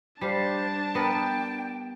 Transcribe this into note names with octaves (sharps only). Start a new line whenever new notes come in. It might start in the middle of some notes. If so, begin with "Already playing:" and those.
G3 D4 C5 D5 F5 A5
B3 A#4 G5